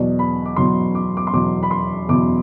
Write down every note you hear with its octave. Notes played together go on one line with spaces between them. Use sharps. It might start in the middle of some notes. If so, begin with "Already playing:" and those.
Already playing: E2 B2 F#3 D5
B5
D6
E2 B2 F#3 C6
D6
D6
C6
E2 B2 F#3 D6
B5
C6
E2 B2 F#3 D6